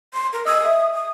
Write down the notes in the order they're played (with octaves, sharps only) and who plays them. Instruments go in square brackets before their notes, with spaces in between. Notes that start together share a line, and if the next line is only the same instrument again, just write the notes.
[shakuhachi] C6
A#4
[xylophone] D#5 E6 [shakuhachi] D#6
[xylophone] E5
[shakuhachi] D#6